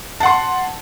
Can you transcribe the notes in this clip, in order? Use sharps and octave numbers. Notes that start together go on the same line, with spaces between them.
F#5 A5 C6